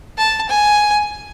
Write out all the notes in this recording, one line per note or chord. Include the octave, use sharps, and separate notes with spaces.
A5
G#5